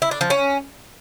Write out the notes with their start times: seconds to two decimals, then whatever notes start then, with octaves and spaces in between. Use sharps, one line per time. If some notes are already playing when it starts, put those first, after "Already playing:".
0.02 E4
0.11 D4
0.21 F3
0.30 C#4